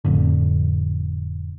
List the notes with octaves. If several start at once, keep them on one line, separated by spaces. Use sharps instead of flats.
F1 F2 A2 D3